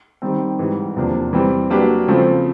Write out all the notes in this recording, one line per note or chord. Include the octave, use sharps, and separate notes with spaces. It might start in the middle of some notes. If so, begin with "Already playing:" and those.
D#3 G3 C4
G#2 E3 G3
E2 C3 F3 A#3 D4
E3 G3 C4
F#3 A#3 D4 G4 B4
C#3 F3 A3 C4